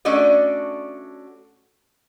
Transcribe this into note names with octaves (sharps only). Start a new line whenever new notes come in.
A3 C#4 D4 F#4 D5 D#5